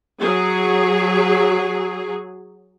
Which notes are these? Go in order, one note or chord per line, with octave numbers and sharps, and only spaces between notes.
F#3 G#4